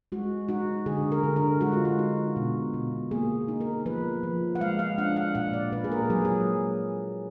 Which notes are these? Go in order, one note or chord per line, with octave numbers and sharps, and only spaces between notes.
G#3 F#4
D#4 F#4
D3 G#4
A#4
D3
A#4
G#3 F#4
F4
F#4
D#4
B2
B2
A#3 G#4
D#4
A#4
F3 B4
F3
F#5
G#3 F5
F5
D4 F#5
F#5
A#2 F#5
D5
A#2 B4
G#4
A#4
F#3 G#4
G#4